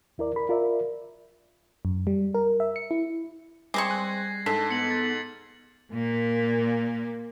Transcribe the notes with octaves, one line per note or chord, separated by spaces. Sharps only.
D#2 E4 A#4 D5
A#4 B5
F4 A#4 D5 E5
F#2
G3
A#4
E5
C#7
E4
G3 G#3 C4 C#6 D6 G#6 A#6 C7
G#5 F#6
G#2 D4 A4 B6
B3 C#7 F#7
A6
A#2 A#3